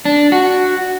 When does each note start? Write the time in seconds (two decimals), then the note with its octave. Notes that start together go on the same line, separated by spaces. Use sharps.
0.05 D4
0.32 F#4